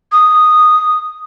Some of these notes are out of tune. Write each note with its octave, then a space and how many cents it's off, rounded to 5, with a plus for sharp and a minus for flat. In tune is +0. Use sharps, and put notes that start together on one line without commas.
D#6 -5